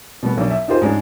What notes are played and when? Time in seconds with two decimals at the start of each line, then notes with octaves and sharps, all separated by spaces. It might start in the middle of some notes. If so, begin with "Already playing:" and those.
0.23 B2 G3 B3
0.37 B1 D4
0.50 E5
0.68 D#4 F4 G4 G#4 C5 D#5
0.82 G#2 G#3 C#4 D4